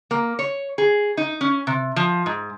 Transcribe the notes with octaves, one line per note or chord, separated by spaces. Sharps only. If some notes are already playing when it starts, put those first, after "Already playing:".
A#3
C#5
G#4
D#4
C#4
C3
F3
G#2